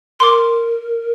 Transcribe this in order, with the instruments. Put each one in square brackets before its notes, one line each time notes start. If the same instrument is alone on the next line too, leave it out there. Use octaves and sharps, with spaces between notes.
[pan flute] A#4 [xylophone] C6 D6